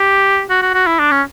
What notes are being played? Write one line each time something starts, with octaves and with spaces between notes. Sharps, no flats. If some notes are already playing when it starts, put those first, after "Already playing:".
Already playing: G4
F#4
F#4
F#4
E4
D4
C#4